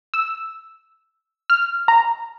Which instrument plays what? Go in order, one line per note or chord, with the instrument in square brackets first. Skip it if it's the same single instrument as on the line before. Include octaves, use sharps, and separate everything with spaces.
[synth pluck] E6
F6
A#5